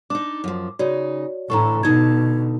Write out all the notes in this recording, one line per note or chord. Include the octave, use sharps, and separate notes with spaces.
D4 D#4 D6
F#2 F3
C#3 D#4 F#4 C#5 D5
A2 D3 E3 A4 A#5 C#6
B2 D3 D#4 A5 G#6